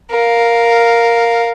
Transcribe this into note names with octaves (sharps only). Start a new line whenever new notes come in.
A#4 F5